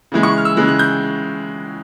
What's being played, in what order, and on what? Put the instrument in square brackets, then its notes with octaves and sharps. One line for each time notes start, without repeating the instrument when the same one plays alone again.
[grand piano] C#3 E3 G#3
C#6
F6
E6
C#3 E3 G#3 F#6
F#6
G6